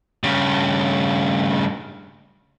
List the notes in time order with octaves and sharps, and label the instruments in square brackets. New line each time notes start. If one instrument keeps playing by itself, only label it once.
[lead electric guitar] G2 C#3